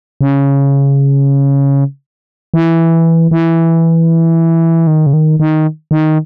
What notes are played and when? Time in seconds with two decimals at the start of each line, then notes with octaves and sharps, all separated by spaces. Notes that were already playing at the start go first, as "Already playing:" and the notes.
0.21 C#3
2.54 E3
3.31 E3
4.87 D#3
5.06 C#3
5.13 D#3
5.40 D#3
5.91 D#3